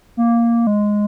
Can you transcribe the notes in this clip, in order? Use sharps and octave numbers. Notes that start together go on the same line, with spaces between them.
A#3
G#3